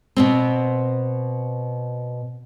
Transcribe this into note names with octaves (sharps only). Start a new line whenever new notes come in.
B2 B3 C4